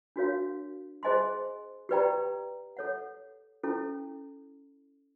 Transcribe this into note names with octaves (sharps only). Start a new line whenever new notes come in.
D4 F#4 A#4 C#5 F5
G#4 C5 D#5 G#5 C6
G4 B4 D5 G5 A#5
A4 C#5 F#5
C#4 E4 A4